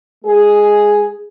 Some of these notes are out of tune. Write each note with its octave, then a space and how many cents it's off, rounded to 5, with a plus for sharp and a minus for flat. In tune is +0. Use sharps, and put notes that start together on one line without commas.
G#3 +0 G#4 +0